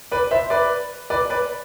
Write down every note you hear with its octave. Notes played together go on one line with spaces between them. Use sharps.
B4 D5
C5 E5
B4 D5
B4 D5
B4 D5